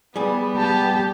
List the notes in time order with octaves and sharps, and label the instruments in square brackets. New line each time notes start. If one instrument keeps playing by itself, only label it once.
[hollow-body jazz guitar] G3 G#4 [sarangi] B3
[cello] G4 [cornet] A5